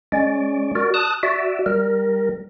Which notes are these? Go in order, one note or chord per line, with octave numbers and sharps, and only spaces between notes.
G#3 C#4 D5
F#4 A#4 D5
A5 D#6 F#6
F#4 D5 E5
G3 A#4